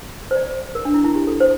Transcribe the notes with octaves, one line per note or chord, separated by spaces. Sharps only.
C5
D5
A#4
D4
E4
E4
G4
A4
C5